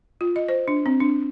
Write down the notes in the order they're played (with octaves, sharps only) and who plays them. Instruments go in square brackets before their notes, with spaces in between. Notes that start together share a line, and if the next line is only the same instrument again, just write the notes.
[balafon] F4
D#5
C5
D4
C4
D4